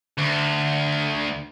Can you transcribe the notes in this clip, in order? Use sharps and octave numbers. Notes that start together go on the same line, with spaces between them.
D2